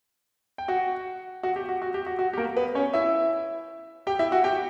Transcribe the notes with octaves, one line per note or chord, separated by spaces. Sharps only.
G5
F#4 F#5
F#4 F#5
G4
F#4
F#4
G4
F#4
F#4
G4
A#3 A#4
B3 B4
C#4 C#5
E4 E5
G4 G5
E4 E5
F#4 F#5
G4 G5